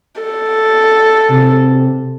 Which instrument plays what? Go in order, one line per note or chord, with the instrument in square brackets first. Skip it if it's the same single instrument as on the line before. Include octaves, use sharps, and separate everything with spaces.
[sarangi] A4
[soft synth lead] C3